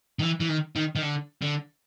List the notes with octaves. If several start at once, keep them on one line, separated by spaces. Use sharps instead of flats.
D#3
E3
E3
D#3
D#3
D#3
D3
D3